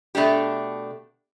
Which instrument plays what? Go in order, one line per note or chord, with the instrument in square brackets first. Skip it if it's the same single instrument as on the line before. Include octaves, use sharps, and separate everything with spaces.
[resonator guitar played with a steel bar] B2 A3 D4 G4